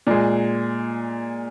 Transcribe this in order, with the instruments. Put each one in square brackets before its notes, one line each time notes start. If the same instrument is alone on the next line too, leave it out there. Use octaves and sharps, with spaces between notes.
[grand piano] A#2 G#3